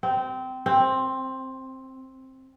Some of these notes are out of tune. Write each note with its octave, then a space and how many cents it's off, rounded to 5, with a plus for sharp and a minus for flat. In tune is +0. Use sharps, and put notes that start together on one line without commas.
C4 -20
C4 +10